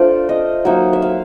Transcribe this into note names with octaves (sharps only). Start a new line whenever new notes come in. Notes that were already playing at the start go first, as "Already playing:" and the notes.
Already playing: A3 D4 F4 C5 D5
D#5
F#3 A#3 D#4 E5
E5
F5